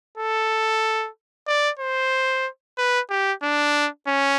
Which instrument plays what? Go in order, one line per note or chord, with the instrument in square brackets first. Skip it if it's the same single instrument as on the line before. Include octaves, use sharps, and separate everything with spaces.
[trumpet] A4
D5
C5
B4
G4
D4
C#4